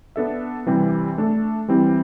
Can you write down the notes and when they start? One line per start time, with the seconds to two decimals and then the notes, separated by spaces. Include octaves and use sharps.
0.16 B3 D4 A4 E5
0.66 C3 E3 G3 C4
1.18 A3 D4 A4
1.68 E3 G3 C4 E4